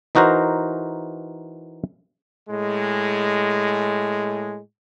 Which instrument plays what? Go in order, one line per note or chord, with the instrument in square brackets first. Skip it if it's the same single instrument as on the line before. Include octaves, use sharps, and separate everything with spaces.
[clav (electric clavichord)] E3 D#4 F#4 A#4 C5
[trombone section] A2 G#3